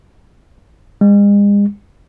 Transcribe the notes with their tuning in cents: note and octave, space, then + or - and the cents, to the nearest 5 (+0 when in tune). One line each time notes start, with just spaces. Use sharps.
G#3 -40